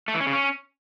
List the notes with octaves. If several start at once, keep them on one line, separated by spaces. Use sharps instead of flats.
A3
E3
C#4
C#3
C#4